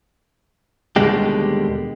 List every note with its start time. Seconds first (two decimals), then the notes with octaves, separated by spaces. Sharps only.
0.96 D#2 B2 D3 G3 G#3 G4